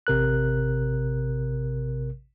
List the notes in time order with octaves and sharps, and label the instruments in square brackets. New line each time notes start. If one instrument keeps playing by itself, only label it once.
[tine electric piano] A1 C3 A#4 F#6